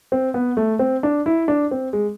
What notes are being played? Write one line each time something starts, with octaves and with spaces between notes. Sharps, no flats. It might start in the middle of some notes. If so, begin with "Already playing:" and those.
C4
B3
A3
C4
D4
E4
D4
C4
G#3